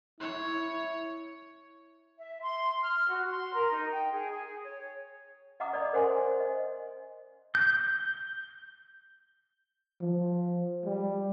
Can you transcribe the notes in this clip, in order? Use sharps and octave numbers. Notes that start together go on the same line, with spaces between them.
E4 C#5
E5
C6
F6
F#4
C6
A#4
D#4
G5
G#4
G#4
C#5
D#5 F5 F#5 A#5 D6 D#6
D5 D#5 B5
A#4 C5 F#5 G#5 C6
D#5
G6
F3
G3